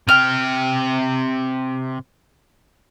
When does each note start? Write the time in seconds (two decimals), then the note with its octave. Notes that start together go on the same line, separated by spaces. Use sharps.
0.09 C3 G5 F6